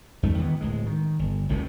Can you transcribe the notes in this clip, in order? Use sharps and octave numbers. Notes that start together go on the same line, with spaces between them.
E2 G#2 A3
D#3 E3 A3 B3
D1 A2 G#3
D#3
G1
F1 C#2 A2 C3